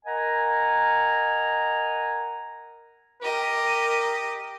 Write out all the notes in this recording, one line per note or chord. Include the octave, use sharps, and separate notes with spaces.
A#4 D#5 F#5 G#5 A#5
G4 A#4 D#5